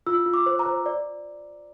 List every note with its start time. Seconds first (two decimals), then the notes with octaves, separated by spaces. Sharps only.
0.06 F4 E6
0.26 F4
0.34 D6
0.46 C5
0.59 A#5
0.66 C5
0.86 D5